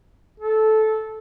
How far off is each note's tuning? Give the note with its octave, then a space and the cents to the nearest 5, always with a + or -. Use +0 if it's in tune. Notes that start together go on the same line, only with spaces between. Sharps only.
A4 -15